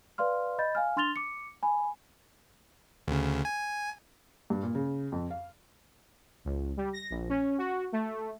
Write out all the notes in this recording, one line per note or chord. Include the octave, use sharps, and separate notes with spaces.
B4 D5 F5 C6 F6
D#5 B5 G6 A6
F5 G#5 F6
D4 C6 F6 A6 F7 G7
D6 C#7
G#5 B5
D2 C#3
G#5
G2
A#2
C#3
F2
F5
C#2
G3
A#6
A#1
C#4
F#4
A3